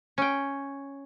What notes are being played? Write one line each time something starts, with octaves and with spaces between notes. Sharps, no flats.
C#4 G5